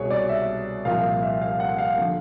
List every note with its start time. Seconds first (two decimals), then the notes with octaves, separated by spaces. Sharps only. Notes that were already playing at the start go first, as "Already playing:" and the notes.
Already playing: C2 B2 G#4 C#5
0.10 D5
0.29 E5
0.85 C2 A#2 F3 F5
1.22 E5
1.42 F5
1.60 F#5
1.78 F5
1.98 D3 F3